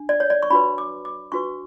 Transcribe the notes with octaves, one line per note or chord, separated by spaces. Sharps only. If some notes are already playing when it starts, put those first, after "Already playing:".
Already playing: D4
D5
C#5
D5
C#6
D4 F#4 B4 B5
D6
D6
D4 F#4 B4 C#6